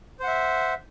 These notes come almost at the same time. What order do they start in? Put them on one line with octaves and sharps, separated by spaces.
C5 F#5 E5